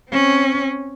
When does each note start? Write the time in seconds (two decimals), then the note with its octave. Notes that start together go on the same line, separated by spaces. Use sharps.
0.11 C4 C#4